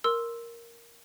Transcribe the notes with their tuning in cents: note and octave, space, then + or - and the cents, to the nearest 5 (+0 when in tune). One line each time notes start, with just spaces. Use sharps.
A#4 +0 C6 +0 E6 -5